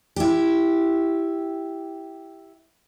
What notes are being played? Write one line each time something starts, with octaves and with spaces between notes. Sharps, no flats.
E4 G4